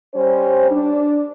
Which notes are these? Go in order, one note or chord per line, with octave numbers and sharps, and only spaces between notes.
G3 C#4 C5
D4